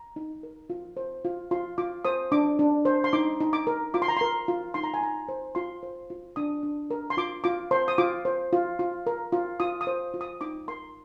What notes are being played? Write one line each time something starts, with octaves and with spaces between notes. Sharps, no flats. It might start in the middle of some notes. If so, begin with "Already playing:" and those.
Already playing: A#5
D#4
A#4
F4
C5
F4
F4 C6
F4 D6
C5 D#6
D4 D6
D4
C5
C6
D#4 D6
D#4
D6
A#4
F4 D6
C6
A#5
A#4 C6
F4
D#4 C6
A#5
G#5
D#4 A#5
C5
F4 C6
C5
F4
D4 D#6
D4
A#4
C6
F4 D6
F4 D6
C5 C6
D#6
F4 D6
C5
F4
F4
A#4
F4
F4 D#6
D#6
C5
F4
D#6
D#4 D6
A#4 C6